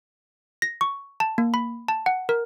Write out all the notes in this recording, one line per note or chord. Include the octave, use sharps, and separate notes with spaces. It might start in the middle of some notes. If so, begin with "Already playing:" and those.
A#6
C#6
A5
A#3
B5
A5
F#5
A#4